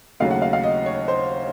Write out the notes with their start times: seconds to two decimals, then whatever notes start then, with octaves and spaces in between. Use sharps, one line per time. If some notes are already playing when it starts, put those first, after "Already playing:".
0.20 D#2 C#3 F#3 A3 F5
0.31 F#5
0.42 F5
0.53 F5
0.63 D#5
0.86 C#5
1.08 C5